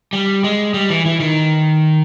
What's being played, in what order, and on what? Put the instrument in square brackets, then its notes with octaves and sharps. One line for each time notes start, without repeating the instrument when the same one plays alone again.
[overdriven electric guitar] G3
G#3
G3
E3
E3
D#3